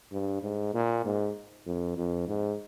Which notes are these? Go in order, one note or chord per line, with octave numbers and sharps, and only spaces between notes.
G2
G#2
A#2
G#2
F2
F2
G#2